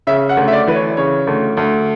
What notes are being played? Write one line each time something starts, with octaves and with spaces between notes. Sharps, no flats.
C#3 E5
F#5
D2
E5
D5
E3 B4
C#5
C#3 C#5
D2
D2